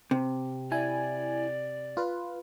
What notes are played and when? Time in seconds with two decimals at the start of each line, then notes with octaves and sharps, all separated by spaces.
0.11 C3
0.72 E4 D5 G#5
1.97 F4 B4